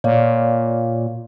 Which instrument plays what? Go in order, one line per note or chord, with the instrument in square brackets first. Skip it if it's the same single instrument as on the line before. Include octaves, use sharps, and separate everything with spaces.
[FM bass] A#2 [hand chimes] C#5 D5 F5